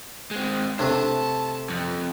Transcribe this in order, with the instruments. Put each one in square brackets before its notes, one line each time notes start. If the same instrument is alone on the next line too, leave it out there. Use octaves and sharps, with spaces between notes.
[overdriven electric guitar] G#3 C4
[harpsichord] C3 A3 [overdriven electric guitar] D4
[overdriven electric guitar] A5
F2